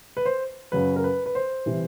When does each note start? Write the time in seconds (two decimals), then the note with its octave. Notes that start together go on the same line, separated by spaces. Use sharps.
0.17 B4
0.26 C5
0.72 F#2 C#3 F#3 B4
0.96 A#4
1.04 B4
1.26 B4
1.35 C5
1.66 C3 E3 G3